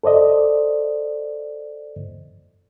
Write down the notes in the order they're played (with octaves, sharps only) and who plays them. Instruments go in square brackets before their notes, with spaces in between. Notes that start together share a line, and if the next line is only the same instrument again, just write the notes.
[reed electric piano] A4 C5 D5 D#5